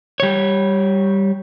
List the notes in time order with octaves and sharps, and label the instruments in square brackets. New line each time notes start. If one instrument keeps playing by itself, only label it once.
[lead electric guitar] G3 C#5